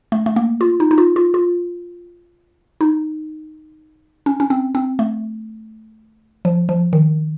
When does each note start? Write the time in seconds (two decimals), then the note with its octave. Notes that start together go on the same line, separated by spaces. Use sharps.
0.12 A3
0.26 A3
0.36 A#3
0.61 F4
0.80 D#4
0.91 D#4
0.98 F4
1.16 F4
1.34 F4
2.81 D#4
4.26 C#4
4.40 C#4
4.50 C4
4.75 C4
4.99 A3
6.45 F3
6.69 F3
6.93 D#3